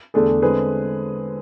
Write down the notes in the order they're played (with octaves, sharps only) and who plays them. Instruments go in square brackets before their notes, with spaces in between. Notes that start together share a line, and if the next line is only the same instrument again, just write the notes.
[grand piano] E2 D3 A3 D4 G#4
D3 G#3 C4 G#4 B4